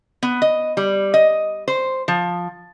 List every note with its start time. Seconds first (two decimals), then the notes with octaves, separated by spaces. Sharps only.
0.23 B3
0.42 D#5
0.77 G3
1.14 D#5
1.68 C5
2.08 F3